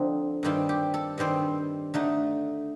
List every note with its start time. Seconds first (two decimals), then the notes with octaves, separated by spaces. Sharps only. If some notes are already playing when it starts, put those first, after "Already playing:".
Already playing: D3 F3 C4 D#4
0.43 G2 D#3 G3 C4 F4
0.69 G4
0.94 A4
1.18 G2 D#3 G3 C4 C5
1.94 D3 A3 D#4